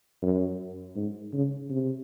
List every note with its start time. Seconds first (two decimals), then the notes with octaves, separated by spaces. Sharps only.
0.22 F#2
0.95 G#2
1.33 C#3
1.70 C3